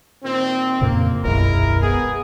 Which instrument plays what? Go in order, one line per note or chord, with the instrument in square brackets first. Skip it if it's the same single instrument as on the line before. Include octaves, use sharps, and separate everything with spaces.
[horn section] A#2 D#3 C4
[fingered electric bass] F2 A#2 C#3 [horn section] A#3
[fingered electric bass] D#1 B1 F#2 [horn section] G#3 E4 A#4
[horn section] B3 G#4